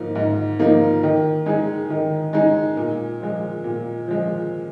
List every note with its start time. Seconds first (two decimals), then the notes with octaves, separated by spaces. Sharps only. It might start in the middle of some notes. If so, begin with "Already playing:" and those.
Already playing: G#2 F3 A#3 D#4
0.15 G#2
0.59 F3 A#3 D#4
1.03 D#3
1.46 G#3 D#4 G#4
1.90 D#3
2.33 G#3 D#4 G#4
2.77 A#2
3.20 F3 G#3
3.64 A#2
4.07 F3 G#3